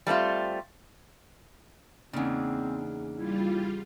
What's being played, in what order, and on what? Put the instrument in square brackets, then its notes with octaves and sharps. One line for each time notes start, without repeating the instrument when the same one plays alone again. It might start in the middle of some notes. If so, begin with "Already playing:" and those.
[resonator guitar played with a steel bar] G3 A3 C4 F4
[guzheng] E2 C#3 [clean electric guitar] A#3 D4 D#4 [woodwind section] C4
[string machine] G3 F4 [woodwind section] E4